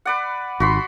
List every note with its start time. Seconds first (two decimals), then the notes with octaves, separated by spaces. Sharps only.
0.05 B4 D5 F#5
0.60 G#1 F#4 B5 C6